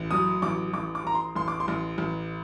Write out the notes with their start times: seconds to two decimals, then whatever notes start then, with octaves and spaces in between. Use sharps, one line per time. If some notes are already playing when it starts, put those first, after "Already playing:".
Already playing: A1
0.11 F#3 D#6
0.42 A1 D6
0.73 A1 D6
0.95 D6
1.04 A1 A#5
1.15 C6
1.35 A1 C6
1.48 D6
1.60 C6
1.68 A1
1.98 A1